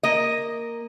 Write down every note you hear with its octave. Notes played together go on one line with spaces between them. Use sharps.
A#3 D#5